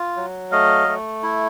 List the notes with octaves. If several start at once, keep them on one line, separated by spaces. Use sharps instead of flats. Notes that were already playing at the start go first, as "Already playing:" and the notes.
Already playing: F4
F#3
A3 D#5 F5
A3
E4